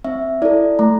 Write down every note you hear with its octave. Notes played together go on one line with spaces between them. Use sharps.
C4 E5
E4 A4 D5
A3 A#5